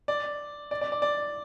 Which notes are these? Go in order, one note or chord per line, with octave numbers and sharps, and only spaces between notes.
D5
D5
D5
D5
D5